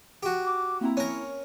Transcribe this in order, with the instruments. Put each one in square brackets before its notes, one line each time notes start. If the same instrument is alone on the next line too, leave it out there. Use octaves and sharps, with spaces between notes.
[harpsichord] F#4 G4
[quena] D6
[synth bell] A#3 C4 A#5 [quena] E4
[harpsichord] C#4 A#4 [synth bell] C#5